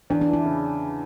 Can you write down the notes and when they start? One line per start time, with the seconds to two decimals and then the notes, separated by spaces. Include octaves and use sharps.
0.10 E2 D4
0.21 D4
0.28 E3
0.33 E4
0.45 C#3